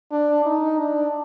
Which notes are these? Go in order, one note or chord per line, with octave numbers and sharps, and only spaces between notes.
D4
D#4
D4